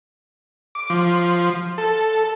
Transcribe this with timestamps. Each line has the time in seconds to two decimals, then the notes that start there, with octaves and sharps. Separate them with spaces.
0.75 D6
0.90 F3
1.78 A4